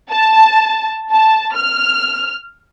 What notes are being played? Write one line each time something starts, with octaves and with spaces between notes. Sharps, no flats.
A5
A5
F6